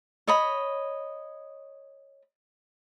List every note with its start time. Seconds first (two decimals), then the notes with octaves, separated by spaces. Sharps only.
0.27 C#5 D#5 B5